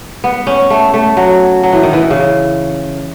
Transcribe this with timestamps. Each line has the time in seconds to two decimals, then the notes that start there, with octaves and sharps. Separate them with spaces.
0.24 B3
0.47 C#4
0.70 A3
0.94 A3
1.17 F#3
1.63 F#3
1.72 E3
1.83 D#3
1.93 E3
2.10 C#3